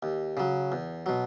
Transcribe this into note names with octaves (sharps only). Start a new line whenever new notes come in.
D#2
C#3 F#3
E2
B2 F#3